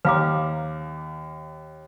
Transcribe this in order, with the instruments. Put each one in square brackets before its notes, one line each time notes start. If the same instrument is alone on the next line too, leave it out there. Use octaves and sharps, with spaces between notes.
[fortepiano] D#2 A#5 [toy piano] B4 F5 D6